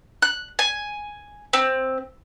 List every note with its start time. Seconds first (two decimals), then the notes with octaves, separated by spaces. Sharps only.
0.22 F#6
0.59 G#5
1.53 C4